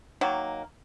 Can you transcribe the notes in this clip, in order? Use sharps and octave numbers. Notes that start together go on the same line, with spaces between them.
D#3 F#3 A#3